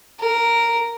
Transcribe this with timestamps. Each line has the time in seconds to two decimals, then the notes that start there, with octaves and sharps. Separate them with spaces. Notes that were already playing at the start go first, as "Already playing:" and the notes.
0.20 A#4